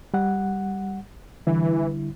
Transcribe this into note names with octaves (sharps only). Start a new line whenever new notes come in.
G3 F#5
D3 E3 G3 E4